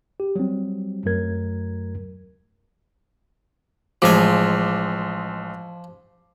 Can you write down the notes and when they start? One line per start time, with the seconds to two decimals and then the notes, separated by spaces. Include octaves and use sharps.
0.20 G4
0.36 F#3 G3 C4
1.05 F#2 F#3 A3 A#4 G#6
4.02 A1 F3 G#3 G#5 D6